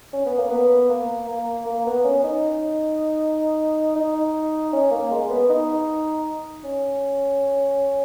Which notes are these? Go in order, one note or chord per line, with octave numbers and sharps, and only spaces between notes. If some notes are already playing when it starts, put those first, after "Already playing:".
C#4
B3
A#3
B3
A#3
A#3
A#3
B3
C#4
D#4
D#4
C#4
A#3
G#3
B3
D#4
C#4